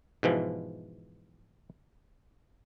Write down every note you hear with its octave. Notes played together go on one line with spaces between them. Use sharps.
G#2 B2 E3 F3